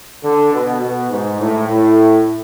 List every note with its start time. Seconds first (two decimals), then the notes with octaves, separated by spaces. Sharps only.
0.24 D3
0.53 B2
0.82 B2
1.10 G#2
1.40 A2
1.68 A2